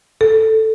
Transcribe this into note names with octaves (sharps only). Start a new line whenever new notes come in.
A4